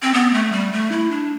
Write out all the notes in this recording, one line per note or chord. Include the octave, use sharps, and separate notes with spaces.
C4
B3
A3
G3
A3
E4
D4